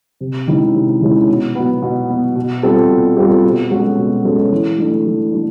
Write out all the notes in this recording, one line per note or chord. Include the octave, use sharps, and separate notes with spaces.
C3
D#3 G#3 C#4 E4
C3
D#3 G#3 C#4 E4
B2
F#3 B3
B2
F#3 B3
B2
G3 C4 F4 A4
B2
G3 C4 F4 A4
B2
G#3 C#4 F#4 A4
B2
G#3 C#4 F#4 A4
E3
A3 D4
E3
A3 D4